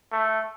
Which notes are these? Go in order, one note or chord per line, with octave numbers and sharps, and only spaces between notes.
A3